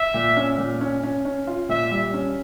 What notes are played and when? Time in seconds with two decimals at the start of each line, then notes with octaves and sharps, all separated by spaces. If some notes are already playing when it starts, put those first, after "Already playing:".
Already playing: E5
0.14 A#2
0.37 C#4
0.58 A#2
0.81 C#4
1.03 C#4
1.25 C#4
1.47 F4
1.69 A#2 E5
1.91 G3
2.13 C#4